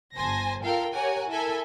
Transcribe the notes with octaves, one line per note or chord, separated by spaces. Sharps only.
G1 C5 G#5 A5 A#6
F4 A4 A#4 F5 G5
G4 A#4 C#5 F#5 G#5
E4 A4 A#4 E5 G#5